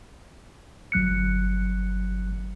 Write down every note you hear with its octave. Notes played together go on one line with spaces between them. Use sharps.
G1 F#3 F#6 C#7